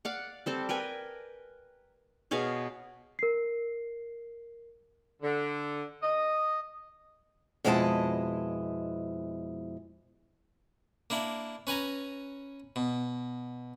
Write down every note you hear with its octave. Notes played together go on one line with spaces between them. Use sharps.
D5 F5 F#5
G3 C4 A4
A#4 B4 G5 G#5
B2 G#4 C#5 F5
A#4 C7
D3
D#5
F2 B2 G#3 E4 D#5 A5
A#3 D4 E4
C#4 B4 G#5 A#5
B2